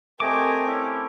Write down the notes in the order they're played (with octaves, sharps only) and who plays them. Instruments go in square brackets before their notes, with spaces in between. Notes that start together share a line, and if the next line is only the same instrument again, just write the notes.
[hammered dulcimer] A3 [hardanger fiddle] C4 A#4 [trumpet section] G4 D#5 G#5 [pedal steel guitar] D6
[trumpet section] C#4 E4